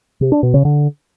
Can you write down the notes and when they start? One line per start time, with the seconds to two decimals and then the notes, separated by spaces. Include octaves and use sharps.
0.21 C3
0.32 D4
0.43 B2
0.54 C#3
0.65 D3